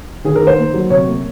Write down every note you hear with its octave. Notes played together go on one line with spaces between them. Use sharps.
D#3 G#4
A#4
D#3
C5
A#3
F#3
C3 C#5
A#3